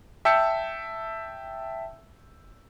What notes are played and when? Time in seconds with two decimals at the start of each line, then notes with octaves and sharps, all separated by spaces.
0.25 E5 G5 A5 E6 G6 C#7